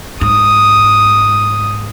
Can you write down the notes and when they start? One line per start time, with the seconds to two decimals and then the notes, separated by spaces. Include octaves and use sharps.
0.21 G#2 D#6